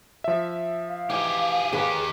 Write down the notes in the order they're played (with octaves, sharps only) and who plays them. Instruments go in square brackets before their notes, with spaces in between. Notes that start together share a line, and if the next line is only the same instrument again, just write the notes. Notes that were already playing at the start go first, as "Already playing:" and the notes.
[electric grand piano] F3 E5
[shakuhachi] F5
[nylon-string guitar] E3 D#4 [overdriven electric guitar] G4 G#4
[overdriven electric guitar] D#3 G4 [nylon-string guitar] G#4 B4